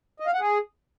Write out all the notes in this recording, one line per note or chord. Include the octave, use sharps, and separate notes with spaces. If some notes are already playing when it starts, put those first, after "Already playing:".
D#5
F5
F#5
G#4